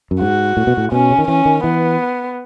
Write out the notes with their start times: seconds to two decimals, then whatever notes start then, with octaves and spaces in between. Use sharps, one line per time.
0.11 F#2
0.20 G#2 F#4
0.57 A2
0.67 B2
0.77 A2
0.92 B2 C#4
1.11 C#3
1.18 D#3
1.28 E3 C#4
1.45 D#3
1.64 E3 B3